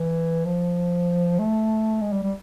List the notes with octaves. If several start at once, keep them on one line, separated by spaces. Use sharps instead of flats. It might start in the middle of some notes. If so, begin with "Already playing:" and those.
Already playing: E3
F3
A3
G#3
G3
G3